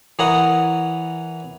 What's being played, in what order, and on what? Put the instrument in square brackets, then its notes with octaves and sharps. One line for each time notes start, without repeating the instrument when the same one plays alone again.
[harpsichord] E3 A#4 C#5 F#5 D#6